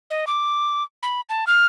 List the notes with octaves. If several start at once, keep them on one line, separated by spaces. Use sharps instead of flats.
D#5
D6
B5
A5
F6